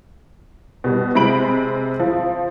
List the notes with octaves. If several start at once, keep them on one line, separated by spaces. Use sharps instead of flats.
B2 G3
C3 G#3 B5 D7 F#7
F3